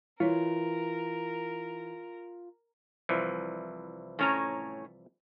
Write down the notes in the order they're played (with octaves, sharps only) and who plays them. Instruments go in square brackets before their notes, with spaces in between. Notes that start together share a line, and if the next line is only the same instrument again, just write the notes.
[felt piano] E3 [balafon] E4 C#5 [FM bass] F4 [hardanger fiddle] A#4
[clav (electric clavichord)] C2 E3 F3
[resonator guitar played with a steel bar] A2 C#4 A#5